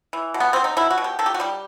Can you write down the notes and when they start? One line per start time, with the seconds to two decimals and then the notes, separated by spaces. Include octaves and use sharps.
0.13 E3
0.34 B2
0.40 B3
0.53 B2 C4
0.64 D#4
0.77 B2 E4
0.90 F#4
0.98 B2
1.04 G4
1.19 D#3 A4
1.26 G4
1.34 F#4
1.40 G3 G4